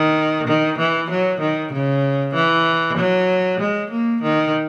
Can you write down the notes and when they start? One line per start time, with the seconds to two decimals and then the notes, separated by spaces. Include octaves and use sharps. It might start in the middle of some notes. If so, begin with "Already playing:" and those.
Already playing: D#3
0.47 D#3
0.78 E3
1.10 F#3
1.41 D#3
1.73 C#3
2.35 E3
2.98 F#3
3.60 G#3
3.91 A#3
4.22 D#3